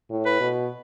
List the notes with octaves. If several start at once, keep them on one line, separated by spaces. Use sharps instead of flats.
A2
B4
B2